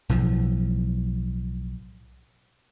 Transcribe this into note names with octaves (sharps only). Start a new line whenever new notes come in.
B1 A2 F3